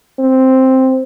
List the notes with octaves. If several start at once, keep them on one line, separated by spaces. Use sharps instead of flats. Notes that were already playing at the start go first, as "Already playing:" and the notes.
C4